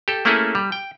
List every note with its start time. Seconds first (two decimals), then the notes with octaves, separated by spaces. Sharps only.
0.08 G4 A4
0.25 A3 A#3 C#4 E4 G#4 A4
0.55 G3
0.72 G5